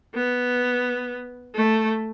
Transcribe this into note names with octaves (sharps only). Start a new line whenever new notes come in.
B3
A3